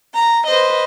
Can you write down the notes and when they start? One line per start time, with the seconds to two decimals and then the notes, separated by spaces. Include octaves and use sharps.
0.13 A#5
0.46 B4 C5 D#5